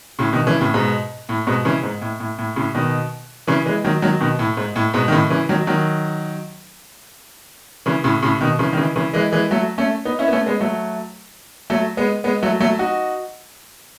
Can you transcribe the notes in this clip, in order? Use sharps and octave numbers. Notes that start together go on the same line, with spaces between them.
A2 C#3
B2 D#3
C#3 E3
A2 C#3
G#2 B2
A2
G#2 B2
C#3 E3
G#2
A2
A2
A2
A2 C#3
B2 D#3
C#3 E3
E3 G#3
D#3 F#3
D#3 F#3
B2 D#3
A2
G#2
A2
G#2 B2
D#3
A2 C#3
C#3 E3
D#3 F#3
D#3 F#3
C#3 E3
A2 C#3
A2 C#3
B2 D#3
C#3 E3
D#3
C#3 E3
C#3 E3
E3 G#3
E3 G#3
F#3 A3
A3 C#4
B3 D#4
C#4 E4
B3
A3 C#4
G#3 B3
F#3 A3
F#3 A3
G#3 B3
G#3 B3
F#3 A3
F#3 A3
D#4 F#4